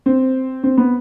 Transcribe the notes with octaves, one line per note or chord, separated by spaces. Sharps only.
C4
C4
B3